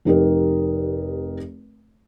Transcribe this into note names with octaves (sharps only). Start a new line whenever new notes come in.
F1 D#4 G4 A#4